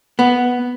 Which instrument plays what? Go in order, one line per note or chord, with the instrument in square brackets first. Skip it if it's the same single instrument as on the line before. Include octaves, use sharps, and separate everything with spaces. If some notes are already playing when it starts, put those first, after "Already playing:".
[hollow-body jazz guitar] B3